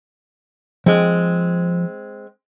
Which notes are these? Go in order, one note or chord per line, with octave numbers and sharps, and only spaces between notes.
F3 G#3 C4 G5